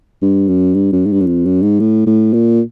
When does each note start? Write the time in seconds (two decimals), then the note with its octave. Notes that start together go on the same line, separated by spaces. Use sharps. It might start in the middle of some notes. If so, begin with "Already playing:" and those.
0.22 G2
0.48 F#2
0.74 G2
0.92 F#2
1.06 G#2
1.12 G2
1.21 F#2
1.27 F2
1.45 F#2
1.62 G#2
1.80 A2
2.06 A2
2.33 A#2